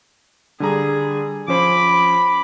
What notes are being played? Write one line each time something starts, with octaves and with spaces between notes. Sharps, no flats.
D3 G3 G#4 A#5
F3 C#4 C5 B5 D6